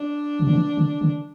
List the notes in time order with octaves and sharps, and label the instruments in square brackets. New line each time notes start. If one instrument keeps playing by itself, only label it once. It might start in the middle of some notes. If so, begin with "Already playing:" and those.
Already playing: [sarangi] D4
[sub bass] C3
D3
E3
D3
D3